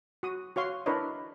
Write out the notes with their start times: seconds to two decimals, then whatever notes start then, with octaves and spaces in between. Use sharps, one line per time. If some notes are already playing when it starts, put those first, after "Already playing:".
0.23 F#4 D#6
0.56 F#4 C#5 F5 C6
0.86 D4 E4 A#4 B4 C#5 D#5